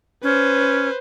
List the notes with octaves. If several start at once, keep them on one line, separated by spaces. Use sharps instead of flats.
C#4 B4 C5